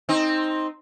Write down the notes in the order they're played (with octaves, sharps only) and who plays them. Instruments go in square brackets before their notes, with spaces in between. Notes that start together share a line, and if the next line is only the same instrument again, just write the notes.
[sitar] C4 D#4